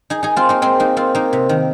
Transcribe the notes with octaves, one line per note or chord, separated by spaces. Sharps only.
D#4 G#4
D#4 G#4
C4 F4
A#3 D#4
G#3 C4
A#3 D#4
C4 F4
A#3 D#4
C3
D#3